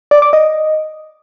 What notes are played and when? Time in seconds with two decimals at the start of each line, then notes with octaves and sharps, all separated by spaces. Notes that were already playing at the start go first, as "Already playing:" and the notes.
0.11 D5
0.22 D6
0.33 D#5